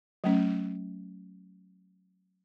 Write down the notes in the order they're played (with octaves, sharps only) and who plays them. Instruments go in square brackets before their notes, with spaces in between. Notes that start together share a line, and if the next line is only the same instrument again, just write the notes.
[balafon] F#3 A3 C#4